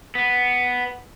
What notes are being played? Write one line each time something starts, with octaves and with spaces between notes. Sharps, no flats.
B3